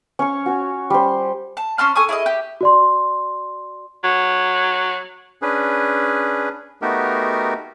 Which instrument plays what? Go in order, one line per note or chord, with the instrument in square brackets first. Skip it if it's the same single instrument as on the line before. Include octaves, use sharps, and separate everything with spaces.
[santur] C#4 C#6
C#4 F#4
G3 C5
[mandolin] A5
C#4 A5 C6 F6
A4 G#5 C#6 D#6
E4 G#4 D5 D#5
G4
[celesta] F#4 D5 C6
[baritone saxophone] F#3
[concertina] C#4 D4 G#4 B4
A3 B3 D#4 F#4 G4 A#4